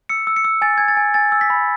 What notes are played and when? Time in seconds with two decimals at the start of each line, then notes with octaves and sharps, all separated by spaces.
0.09 E6 C#7
0.27 E6
0.36 C#7
0.45 E6
0.62 G#5 A6
0.78 G#5 G#6
0.88 A6
0.97 G#5
1.14 G#5 A6
1.32 E6
1.41 B6
1.50 B5